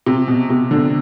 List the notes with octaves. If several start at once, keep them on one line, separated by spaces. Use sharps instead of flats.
C3
B2
C3
D3